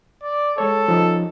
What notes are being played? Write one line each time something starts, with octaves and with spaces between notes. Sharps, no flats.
D5
G#3 A4 C#5
F3 C#4 D#4